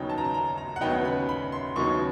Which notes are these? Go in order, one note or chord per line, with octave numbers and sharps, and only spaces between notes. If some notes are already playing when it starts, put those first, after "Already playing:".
Already playing: D#2 C#3 F#3 B3 D#4 G5
A5
A#5
A5
A#5
A#5
F#5
D#2 C#3 F#3 B3 D#4 G5
B5
B5
C6
D#2 C#3 F#3 B3 D#4 C#6